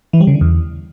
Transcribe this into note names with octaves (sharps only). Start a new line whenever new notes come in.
E3
G3
C#3
D3
E2